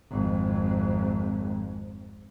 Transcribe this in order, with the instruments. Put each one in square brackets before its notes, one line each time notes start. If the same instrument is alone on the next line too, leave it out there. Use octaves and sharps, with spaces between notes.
[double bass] G#1 F2